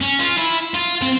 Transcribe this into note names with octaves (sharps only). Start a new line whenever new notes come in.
C#4
F4
E4
F4
C4